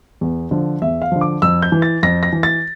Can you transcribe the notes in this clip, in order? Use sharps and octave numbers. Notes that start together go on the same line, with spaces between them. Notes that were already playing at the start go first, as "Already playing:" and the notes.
E2
D3 F3
E2 E5
F5
D3 F3
D6
F2 E6
G6
E3
A6
F2 A#6
A#6
E3
A6